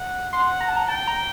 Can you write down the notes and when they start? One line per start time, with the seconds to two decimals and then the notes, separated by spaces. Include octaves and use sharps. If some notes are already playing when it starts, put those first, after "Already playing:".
Already playing: F#5
0.33 F#5 C6
0.60 A#5
0.68 A5
0.76 A#5
0.88 G5 A5
1.07 A#5